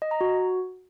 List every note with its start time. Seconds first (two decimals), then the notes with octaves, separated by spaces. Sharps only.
0.02 D#5
0.11 A#5
0.21 F#4